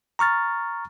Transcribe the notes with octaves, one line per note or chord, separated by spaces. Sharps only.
A#5 C#6 F6 A6